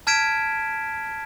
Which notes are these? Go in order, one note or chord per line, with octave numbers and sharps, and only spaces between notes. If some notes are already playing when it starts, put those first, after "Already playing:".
A5 F6 G#6 B6 D7 E7